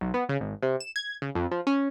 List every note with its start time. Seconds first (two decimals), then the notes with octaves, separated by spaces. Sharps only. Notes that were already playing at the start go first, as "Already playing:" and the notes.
0.01 B1
0.14 B3
0.29 C#3
0.41 G#1
0.63 C3
0.80 E7
0.96 G#6
1.22 C#3
1.35 F2
1.51 F3
1.67 C#4